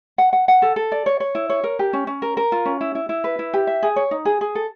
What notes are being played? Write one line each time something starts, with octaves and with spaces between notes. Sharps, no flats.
F#5
F#5
F#5
A4
A4
D5
C#5
C#5
E4
C#5
A#4
G4
C#4
C#4
A#4
A#4
F4
C#4
E4
E4
E4
B4
E4
G4
E5
G#4
C#5
D#4
G#4
G#4
A4